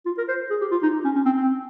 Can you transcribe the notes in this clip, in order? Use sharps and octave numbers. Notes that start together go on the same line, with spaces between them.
F4
A#4
C5
G#4
G4
F4
D#4
C#4
C#4
C4
C4